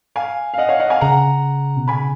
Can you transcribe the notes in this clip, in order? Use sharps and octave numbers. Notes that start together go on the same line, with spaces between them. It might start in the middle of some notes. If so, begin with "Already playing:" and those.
F5 G#5
F5
D#5 F#5
C#5 F5
D#5 F#5
F5 G#5
C#3 F#5 A#5
B2
C#3 G#5 B5